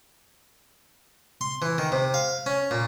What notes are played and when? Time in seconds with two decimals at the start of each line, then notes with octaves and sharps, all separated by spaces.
1.41 C6
1.62 E3
1.78 D#3
1.92 C3
2.14 F5
2.46 C#4
2.71 A#2